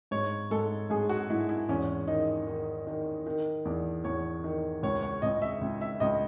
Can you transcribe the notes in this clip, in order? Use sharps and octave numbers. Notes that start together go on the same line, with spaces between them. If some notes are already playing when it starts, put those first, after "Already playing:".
G#2 C#5
G#2 A4
G#2 G#4
F#4
G#2 E4
E4
E2 C#4
D#3 D#4
D#3
D#3
D#3
E2
E2 C#5
D#3
C#2 C#5
C#5
C#2 D#5
E5
C#2
E5
C#2 D#5